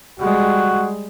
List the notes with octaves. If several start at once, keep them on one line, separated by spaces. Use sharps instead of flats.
G3 G#3 F#4